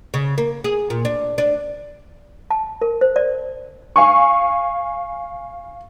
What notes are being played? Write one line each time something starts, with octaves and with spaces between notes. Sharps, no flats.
C#3
A#3
G#4
A#2
D4
D4
A5
A#4
C5
D5
F5 G#5 C#6